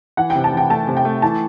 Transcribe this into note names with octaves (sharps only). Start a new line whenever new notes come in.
E3 F#5
G5
C3
A5
E3 G5
A3 A5
C3
G5
A3
E3 A5